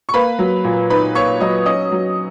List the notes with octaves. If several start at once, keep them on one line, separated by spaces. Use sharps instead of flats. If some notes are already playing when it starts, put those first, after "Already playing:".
C#6
A#3 B4 B5
F#3
A#2
D#4 B4 B5
A#3 C#5 C#6
F#3 D#5 D#6
C#4 D#5 D#6
F#3